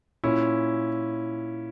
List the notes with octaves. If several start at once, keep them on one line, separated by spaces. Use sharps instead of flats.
A#2 C#4 E4